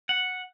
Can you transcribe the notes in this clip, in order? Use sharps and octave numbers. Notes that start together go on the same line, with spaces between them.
F#5